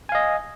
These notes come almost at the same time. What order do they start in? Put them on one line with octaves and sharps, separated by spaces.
G#5 F5 D#5